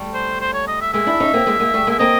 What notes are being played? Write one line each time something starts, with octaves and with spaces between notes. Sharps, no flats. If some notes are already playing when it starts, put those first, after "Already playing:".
Already playing: G3 A3
C5
C5
C#5
D#5
E5
G#3 A#3 E5
D4 E4
C#4 D#4
A#3 C4
G#3 A#3
G#3 A#3
G3 A3
G#3 A#3 E5
A#3 C4 D#5